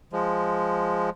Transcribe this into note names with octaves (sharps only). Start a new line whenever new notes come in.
F3 G#3